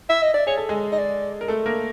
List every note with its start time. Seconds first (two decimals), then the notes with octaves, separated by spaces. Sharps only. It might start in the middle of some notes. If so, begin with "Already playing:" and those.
0.09 E5
0.22 D#5
0.34 D5
0.47 G#4 C#5
0.57 A4
0.69 G#3 G#4
0.92 D#5
0.98 D5
1.41 A#4
1.48 A3 A4
1.66 A#3 A#4